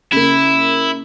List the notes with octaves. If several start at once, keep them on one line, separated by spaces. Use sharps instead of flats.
C#3 A#3 E4